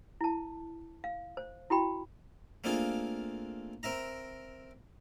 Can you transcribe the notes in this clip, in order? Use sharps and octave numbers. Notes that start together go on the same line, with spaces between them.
E4 A5
F5
C5
E4 F#4 G5 B5
A3 A#3 C4 D4 F4 G#4
C4 A#4 E5 A#5